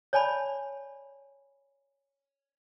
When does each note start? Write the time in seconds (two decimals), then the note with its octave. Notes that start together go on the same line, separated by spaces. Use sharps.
0.13 C#5 D5 G#5 A5 B5